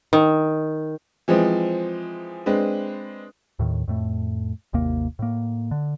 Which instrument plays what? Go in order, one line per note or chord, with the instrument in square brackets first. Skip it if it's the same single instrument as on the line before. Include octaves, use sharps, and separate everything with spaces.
[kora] D#3
[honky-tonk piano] E3 F3 G#3 C4
G#3 C4 D4 B4
[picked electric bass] D#2 A2 D#3
F2 A2 A3
G#1 D#2 C3 A#3
A2 A#3
D3